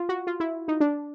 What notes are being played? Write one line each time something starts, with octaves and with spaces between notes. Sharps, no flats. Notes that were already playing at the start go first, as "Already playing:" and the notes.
Already playing: F4
F#4
F4
E4
D#4
D4